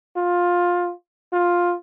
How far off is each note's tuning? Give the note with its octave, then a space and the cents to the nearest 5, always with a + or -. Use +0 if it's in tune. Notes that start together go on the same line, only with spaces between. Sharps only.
F4 +15
F4 +10